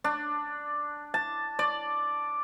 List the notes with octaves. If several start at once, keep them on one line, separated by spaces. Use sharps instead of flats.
D4
A5
D5